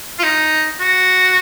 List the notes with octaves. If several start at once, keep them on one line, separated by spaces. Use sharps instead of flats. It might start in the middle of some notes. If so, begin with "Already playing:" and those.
F4
D#4
F#4